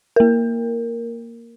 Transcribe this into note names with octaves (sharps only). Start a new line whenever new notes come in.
A#3 A#4